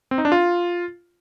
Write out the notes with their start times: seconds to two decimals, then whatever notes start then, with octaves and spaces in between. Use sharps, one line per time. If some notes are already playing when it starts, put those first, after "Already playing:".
0.11 C4
0.18 D#4
0.25 D4
0.32 F4